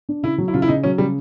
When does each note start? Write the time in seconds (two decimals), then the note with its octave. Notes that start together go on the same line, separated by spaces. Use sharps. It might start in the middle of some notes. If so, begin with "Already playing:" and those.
0.09 D4
0.23 C#3 E4
0.38 F#3
0.48 E4
0.54 C#3 F4
0.62 E4
0.68 C#3 D#4
0.83 F#3 C#4
0.98 C#3 G3